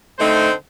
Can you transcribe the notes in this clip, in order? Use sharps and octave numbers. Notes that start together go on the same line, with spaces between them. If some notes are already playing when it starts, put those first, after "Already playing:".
D3 A3 C4 D#4 C5